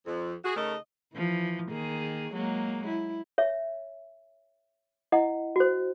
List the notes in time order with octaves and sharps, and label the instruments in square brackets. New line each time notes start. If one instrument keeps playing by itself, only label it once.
[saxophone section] F2
F#4 G#4
C#3 A3 D#4 A4 A#4 D#5
[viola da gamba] E3 F3
D#3 A#3 G#4
F#3 G#3 A#3
E4
[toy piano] C#5 E5
E4 D#5 F#5
F#4 C5